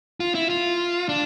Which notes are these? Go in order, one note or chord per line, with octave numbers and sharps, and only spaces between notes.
F4
E4
F4
D4